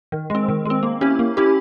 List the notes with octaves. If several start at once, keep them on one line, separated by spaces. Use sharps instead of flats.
D#3
G#3 C4
D#3
G#3 C4
A#3
C#4 E4 G4
A#3
C#4 E4 G4